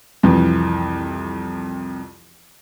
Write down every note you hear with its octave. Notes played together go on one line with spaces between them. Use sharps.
C2 F2 E3